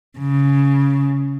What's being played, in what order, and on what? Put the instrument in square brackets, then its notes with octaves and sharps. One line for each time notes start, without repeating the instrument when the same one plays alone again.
[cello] C#3